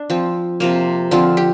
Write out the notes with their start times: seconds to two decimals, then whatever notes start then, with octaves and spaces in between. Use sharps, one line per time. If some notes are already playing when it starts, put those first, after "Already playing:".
Already playing: D4
0.10 F3 C4
0.60 C3 F3 A#3
1.11 D3 F3 C4 F4
1.37 G4